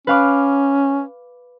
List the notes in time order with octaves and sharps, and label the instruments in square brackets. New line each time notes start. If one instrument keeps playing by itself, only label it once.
[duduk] C#4 [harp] B4 F5 D6